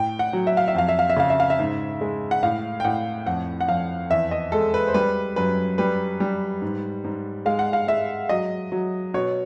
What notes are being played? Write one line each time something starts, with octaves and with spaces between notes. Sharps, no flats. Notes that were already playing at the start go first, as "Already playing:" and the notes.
Already playing: A2 G5
F#5
F#3
E5
F5
E5
F2 F5
E5
F5
E5
C#3 F5
E5
F5
E5
G#2
G#3
F#5
A2 F5
G5
A2 F#5
F2 F#5
F#5
F2 F5
E2 E5
D#5
G#3 A4
B4
C5
G3 B4
F#2 B4
G3 B4
G3
G#2
G#2
G#3 F5
F#5
F5
G#3 E5
F#3 D#5
F#3
B2 C#5